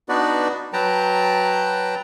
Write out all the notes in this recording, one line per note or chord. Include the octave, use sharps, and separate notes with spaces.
B3 D4 D#4 F#4 B4 D5
F#3 B4 G5 A5 A#5